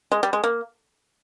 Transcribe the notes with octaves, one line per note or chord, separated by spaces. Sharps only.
G#3
G3
G#3
A#3